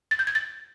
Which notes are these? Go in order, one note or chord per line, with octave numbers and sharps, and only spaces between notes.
A6
G6
G#6
A6